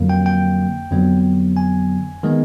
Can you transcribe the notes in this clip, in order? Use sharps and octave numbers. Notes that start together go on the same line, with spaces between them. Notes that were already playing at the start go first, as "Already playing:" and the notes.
Already playing: F2 D3 F#3 A#3
G5
G5
F2 D3 F#3 B3
G#5
D#3 G#3 B3